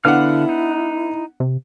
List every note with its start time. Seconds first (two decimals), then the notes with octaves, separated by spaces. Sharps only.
0.05 D3 B3 D4 E4 F5 F#5 F6
0.49 D#4
1.40 C3